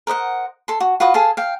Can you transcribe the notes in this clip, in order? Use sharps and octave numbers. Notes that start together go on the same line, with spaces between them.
A#4 C5 D#5 F#5
A4 C6
F#4
F4 F#4 B4 D#5
G#4 A4 F5 A5
F5 G5